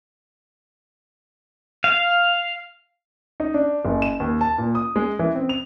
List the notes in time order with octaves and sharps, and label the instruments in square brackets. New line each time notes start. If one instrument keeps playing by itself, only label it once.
[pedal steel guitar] F5
[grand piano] D#4
D4
F#1
E7
D#2
A5
A#2
D#6
G#3
E3
C4
F7